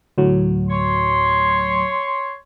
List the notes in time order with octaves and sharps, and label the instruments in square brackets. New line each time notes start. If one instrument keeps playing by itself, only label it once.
[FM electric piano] D2 A2 F#3
[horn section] C#5 C6